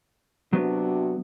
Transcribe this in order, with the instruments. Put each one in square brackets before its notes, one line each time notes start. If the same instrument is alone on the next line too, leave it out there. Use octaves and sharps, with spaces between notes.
[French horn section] C3 D4 F#4 [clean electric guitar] F#3 B3